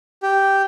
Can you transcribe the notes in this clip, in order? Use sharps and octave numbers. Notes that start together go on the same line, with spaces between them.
G4